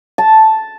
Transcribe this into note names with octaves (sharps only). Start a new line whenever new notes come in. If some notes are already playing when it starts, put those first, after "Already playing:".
A5